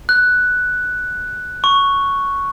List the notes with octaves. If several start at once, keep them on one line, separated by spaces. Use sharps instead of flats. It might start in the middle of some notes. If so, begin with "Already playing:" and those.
F#6
C#6